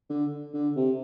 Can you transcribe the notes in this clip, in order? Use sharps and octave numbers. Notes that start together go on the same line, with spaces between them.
D3
D3
C3